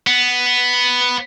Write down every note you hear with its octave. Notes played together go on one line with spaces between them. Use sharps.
B3